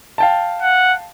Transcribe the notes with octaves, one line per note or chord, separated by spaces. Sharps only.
F5 G5 A5
F#5